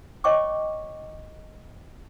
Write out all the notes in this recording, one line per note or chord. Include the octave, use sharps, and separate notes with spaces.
C#5 D#5 G5 C#6 D6